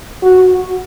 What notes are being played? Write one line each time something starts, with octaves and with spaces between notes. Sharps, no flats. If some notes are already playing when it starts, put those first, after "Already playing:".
F#4